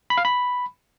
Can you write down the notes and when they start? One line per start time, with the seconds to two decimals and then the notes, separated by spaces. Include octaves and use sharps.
0.10 B5
0.18 F5
0.25 B5